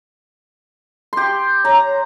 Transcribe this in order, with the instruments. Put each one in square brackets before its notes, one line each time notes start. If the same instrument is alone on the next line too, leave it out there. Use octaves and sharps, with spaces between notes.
[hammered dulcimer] G4 C6
[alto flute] C#5 [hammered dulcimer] A#5